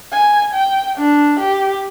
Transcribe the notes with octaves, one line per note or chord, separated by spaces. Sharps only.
G#5
G5
D4
G4